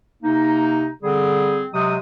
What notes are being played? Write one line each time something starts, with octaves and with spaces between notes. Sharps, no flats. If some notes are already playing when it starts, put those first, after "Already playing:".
C3 A#3 D#4
D3 G3 C4 G#4
C3 F#3 G#3 D#6